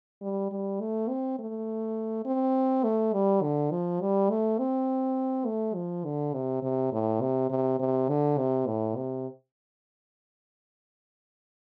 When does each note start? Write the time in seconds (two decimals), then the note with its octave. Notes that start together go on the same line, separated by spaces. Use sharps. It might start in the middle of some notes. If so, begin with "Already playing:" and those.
0.22 G3
0.51 G3
0.81 A3
1.09 C4
1.39 A3
2.26 C4
2.84 A3
3.13 G3
3.43 D3
3.72 F3
4.01 G3
4.30 A3
4.59 C4
5.46 A3
5.75 F3
6.05 D3
6.34 C3
6.63 C3
6.92 A2
7.21 C3
7.50 C3
7.80 C3
8.09 D3
8.38 C3
8.67 A2
8.97 C3